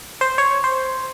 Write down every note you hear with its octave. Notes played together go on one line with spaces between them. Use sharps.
C5
C#5
C5